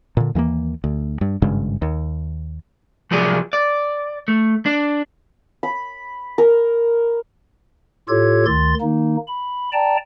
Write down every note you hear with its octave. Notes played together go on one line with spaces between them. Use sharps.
A#2 D3
D#2 E3 F#3 A#3
D2
G2
G#1 G2 C#3 G#3
D#2
C2 F3 F#3 G#4 D5
D5
A3
D4
B5
A#4
A2 F4 G4 A4 C#5 G#6
D2 D#3 C6 A6
D#3 A#3 D#4
B5
D5 G5 A5 A#5